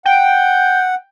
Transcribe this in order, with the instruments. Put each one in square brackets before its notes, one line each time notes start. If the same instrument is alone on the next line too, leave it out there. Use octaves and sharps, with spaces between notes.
[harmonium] F#5 [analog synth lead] G5